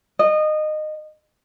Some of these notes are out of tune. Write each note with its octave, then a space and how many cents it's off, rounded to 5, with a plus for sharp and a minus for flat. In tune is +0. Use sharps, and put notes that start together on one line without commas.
D#5 -20